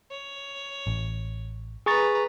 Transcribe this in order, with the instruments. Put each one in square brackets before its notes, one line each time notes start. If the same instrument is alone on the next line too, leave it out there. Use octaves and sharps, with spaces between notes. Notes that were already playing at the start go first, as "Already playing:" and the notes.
[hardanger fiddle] C#5
[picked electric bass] A1
[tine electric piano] G#4 C#6 A6 [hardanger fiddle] B4 A#5